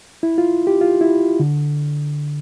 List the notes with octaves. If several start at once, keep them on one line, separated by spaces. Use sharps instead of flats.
E4
F4
G4
F4
E4
D3